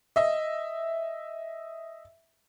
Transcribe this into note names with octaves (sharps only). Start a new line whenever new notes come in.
D#5 E5